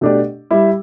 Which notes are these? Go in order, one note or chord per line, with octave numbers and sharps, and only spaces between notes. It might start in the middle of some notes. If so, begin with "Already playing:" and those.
B2 A3 D4 G4 D5
G3 E4 G4 E5